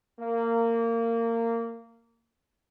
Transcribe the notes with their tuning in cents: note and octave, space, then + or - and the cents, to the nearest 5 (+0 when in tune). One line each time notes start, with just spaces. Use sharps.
A#3 -20